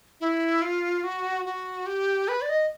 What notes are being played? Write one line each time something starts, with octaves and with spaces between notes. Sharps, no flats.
E4
F4
F#4
F#4
G4
B4
D5
D#5